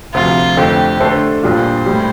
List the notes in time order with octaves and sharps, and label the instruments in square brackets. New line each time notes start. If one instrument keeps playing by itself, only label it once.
[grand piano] D2 C3 F3 [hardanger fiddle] F4
[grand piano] F2 D3 A3 C4 [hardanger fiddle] G4
[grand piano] D3 A3 D4 A4 C5
[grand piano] A#1 A#2 G3 D4 F4 [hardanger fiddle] C5
[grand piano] A2 G3